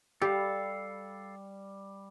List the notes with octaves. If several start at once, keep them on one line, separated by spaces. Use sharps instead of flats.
G3 G4 A4 F5